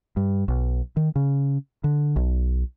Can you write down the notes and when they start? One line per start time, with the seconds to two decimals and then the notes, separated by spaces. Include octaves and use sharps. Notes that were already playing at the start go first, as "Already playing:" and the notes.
0.17 G2
0.48 B1
0.97 D#3
1.16 C#3
1.84 D3
2.16 B1